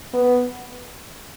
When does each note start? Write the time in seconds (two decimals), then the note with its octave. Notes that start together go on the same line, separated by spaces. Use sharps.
0.14 B3